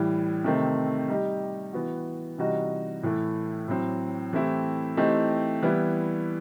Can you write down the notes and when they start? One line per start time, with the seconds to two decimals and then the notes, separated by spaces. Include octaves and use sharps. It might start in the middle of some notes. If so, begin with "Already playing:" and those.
Already playing: A2 E3 G3
0.44 C3 D#3 A3 C4
1.08 G3 D#4 G4
1.73 E3 B3 F#4
2.38 C3 E3 G3 D#4 F#4
3.03 A2 E3 A3
3.68 A2 F#3 C4
4.33 E3 A3 C4 E4 G4
4.97 E3 A3 C4 D#4 G4
5.63 E3 G3 B3 E4